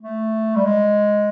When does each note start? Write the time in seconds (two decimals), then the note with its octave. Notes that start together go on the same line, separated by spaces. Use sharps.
0.02 A3
0.56 G3
0.65 G#3